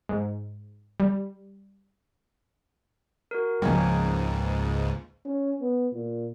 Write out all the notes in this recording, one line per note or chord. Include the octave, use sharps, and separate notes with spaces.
G#2
G3
F#4 A#4
C#2 G#2 F3 G#3 A#3 C#4 G5
C#4
B3
A#2